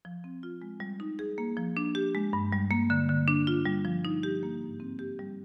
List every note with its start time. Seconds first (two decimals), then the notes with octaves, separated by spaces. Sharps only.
0.05 F3
0.24 C4
0.43 F4
0.62 G#3
0.80 G3
1.00 D#4
1.19 G#4
1.38 A#3
1.57 F3
1.77 D4
1.95 G4
2.15 G#3
2.33 G2
2.52 G3
2.71 A#3
2.90 D3
3.09 D3
3.28 D4
3.47 F4
3.66 G3
3.85 F3
4.05 D#4
4.23 G4
4.43 A#3
4.61 G#2
4.80 C4
4.99 G4
5.19 G3